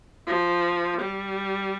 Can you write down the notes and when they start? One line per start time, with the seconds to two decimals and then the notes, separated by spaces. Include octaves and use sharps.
0.27 F3
1.01 G3